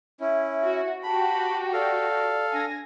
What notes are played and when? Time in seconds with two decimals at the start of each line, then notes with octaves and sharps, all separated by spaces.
0.20 C#4 E4 E5
0.63 F#4
1.03 F#4 G4 G5 A5 B5
1.73 A4 D5 F5
2.53 D4 G#5 A#6